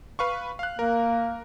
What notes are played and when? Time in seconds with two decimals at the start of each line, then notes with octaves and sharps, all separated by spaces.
0.19 B4 F5 C#6
0.59 F5 F#6
0.79 A#3 A#4